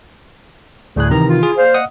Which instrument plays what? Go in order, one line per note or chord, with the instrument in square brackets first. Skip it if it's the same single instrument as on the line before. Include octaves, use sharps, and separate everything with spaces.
[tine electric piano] D2 A2 F#6 [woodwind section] G3 A3 G#4
[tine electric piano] C3 D#3 E3 [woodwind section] A#5
[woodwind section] E4 F4
[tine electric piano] G#4
[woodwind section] A#3 D5 F5 [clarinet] C5
[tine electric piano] D#5 F#5 D#6